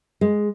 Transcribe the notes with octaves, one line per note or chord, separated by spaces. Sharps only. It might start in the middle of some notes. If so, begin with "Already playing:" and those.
G#3